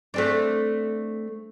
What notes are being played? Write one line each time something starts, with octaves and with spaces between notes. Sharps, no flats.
A3 C4 D4